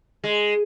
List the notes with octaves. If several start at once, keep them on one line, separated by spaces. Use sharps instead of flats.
G#3